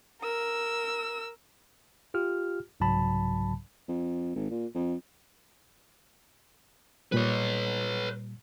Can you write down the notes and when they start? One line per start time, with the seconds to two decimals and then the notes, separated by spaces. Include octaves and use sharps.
0.22 A#4 E6
2.14 F4 G4 F6
2.80 C2 G#2 C#3 F#3 A5 B5
3.88 F2
4.36 G#1
4.50 A#2
4.75 F2
7.12 A#2 G3 B4 C#5